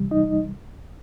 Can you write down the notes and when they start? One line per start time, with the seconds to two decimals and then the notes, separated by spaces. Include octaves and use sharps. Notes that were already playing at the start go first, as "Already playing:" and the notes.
Already playing: C#2 C3 E3 G3
0.11 D#4 D#5